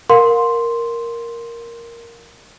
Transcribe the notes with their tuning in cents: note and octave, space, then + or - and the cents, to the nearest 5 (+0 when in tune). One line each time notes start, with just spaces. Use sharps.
A#4 +0 F5 +35 C6 +0